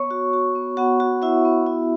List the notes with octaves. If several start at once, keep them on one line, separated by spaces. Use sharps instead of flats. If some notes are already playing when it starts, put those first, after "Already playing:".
Already playing: B3 C#5 C#6
F#4
F#4
B3
B3 F#4 F#5
F#4
E4 F#4 E5
B3
E4